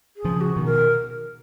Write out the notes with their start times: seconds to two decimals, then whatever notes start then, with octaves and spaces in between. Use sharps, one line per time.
0.17 G#4
0.24 C#3 F3
0.40 F#4
0.56 B2 D#3
0.65 A#4